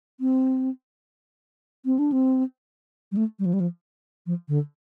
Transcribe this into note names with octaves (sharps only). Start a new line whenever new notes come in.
C4
C4
D4
C4
G3
A3
G3
F3
G3
F3
F3
D3